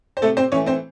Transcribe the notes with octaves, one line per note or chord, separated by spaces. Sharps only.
C5
C3 A3 A4
C4 C5
E3 A3 C#4 C#5
C4 C5